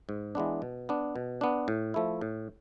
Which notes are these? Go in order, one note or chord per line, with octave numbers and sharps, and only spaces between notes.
G#2
E3 G#3 B3 D4
B2
B3 D4
B2
B3 D4
A2
F3 A3 E4
A2